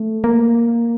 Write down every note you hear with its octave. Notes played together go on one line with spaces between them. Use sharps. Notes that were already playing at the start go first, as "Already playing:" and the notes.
Already playing: A3
A#3